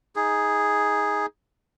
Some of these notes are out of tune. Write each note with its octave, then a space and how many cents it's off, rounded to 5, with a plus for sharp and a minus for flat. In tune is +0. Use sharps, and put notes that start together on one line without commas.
D#4 +25 G#4 +0